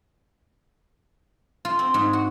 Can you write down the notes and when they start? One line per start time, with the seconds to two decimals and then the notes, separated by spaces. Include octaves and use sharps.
1.65 F4
1.79 C4
1.94 G#2
2.13 F#4